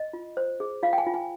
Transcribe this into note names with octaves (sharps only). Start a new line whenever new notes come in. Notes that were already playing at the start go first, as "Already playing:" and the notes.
Already playing: D#5
F4
C5
G#4
F4 F5
G5
G#5
F4
G#5